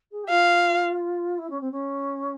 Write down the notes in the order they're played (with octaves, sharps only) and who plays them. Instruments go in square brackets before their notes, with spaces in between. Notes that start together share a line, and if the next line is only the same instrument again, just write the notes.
[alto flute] G#4
G4
[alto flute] F4 [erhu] F5
[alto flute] E4
C#4
C4
C#4